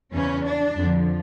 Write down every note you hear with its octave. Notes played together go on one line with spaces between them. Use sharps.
E2 C#3 E3 C#4
D4
F2 D3 F3